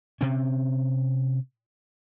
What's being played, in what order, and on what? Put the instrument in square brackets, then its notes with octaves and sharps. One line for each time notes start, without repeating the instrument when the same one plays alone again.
[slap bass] C3 C4 C#4